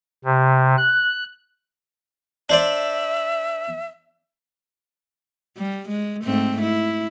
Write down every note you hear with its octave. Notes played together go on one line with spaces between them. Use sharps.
C3
F#6
D4 C5 D5 E5
G3
G#3
G#2 A3 C4
E4